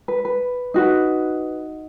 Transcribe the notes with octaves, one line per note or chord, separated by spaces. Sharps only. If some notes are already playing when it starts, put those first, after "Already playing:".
B4
B4
D#4 F#4 B4